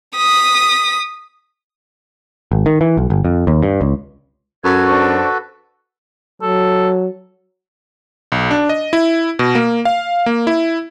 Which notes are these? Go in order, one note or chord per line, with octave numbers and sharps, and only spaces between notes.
D#6 B6
G#1
D#3
E3
B1
G1
F2
D#2
G2
C#2
F#2 F#4 A4 B4 G#6
D4 C5 C#6
F#3 A4
B1
D4
D#5
E4
B2
A#3
F5
A#3
E4